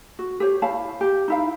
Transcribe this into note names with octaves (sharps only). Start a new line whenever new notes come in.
F#4
G4 C5 C#5
E4 C#5 F5 A5
G4
D#4 E4 F5